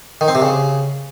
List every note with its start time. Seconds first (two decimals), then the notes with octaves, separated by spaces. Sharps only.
0.21 D#3
0.28 C4
0.35 C3
0.42 C#3